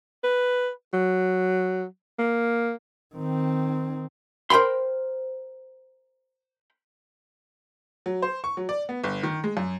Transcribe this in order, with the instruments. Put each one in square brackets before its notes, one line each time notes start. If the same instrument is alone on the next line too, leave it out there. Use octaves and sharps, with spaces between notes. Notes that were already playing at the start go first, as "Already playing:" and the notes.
[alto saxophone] B4
F#3
A#3
[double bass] D#3 C4
[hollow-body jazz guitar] A#4 C5 G5 B5 C6
[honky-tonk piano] F#3
C5
C#6
F#3
D5
B3
G1
D#3
G#3
F#2